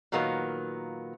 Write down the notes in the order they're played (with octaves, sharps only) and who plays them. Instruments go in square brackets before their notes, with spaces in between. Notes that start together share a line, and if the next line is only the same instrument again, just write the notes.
[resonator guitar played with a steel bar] A#2 D#3 F#3 A#3 B3